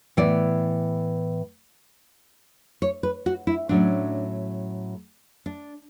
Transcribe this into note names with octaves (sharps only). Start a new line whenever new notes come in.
A2 E3 B3 D5
C#5
B4
F#4
E4
A2 F#3 A3 C#4 D4
D4